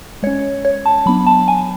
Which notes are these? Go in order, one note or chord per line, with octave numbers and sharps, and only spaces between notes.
G#3 C#4 C#5
C#5
A5
F#3 B3 D4 B5
A5
G#5